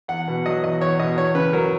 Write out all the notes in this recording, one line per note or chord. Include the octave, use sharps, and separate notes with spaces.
E2 F#5
B2
F#3 D#5
E2 D#5
E2 C#5
B2 D#5
E2 C#5
C#3 B4
F#3 A#4